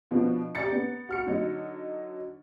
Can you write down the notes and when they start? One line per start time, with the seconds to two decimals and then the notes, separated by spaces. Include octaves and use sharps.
0.11 B2 F3 B3 D4
0.55 G4 D5 A#5 A6 C#7
0.72 B3
1.09 F#4 F6 C#7
1.26 D3 F#3 D#4